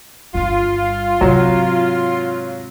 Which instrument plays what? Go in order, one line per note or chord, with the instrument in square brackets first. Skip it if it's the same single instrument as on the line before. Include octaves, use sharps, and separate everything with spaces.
[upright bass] G1 G2 [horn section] F4
[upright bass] G#2 C3 [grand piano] F#3